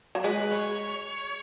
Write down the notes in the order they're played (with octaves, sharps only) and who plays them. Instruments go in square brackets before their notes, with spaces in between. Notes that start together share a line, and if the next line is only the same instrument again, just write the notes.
[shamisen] F#3
[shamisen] G#3 [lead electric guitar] B4
[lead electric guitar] C#5